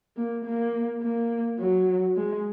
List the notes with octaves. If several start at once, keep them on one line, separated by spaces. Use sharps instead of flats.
A#3
A#3
A#3
F#3
G#3